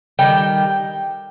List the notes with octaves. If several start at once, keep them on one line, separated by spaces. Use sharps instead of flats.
D#3 G3 G5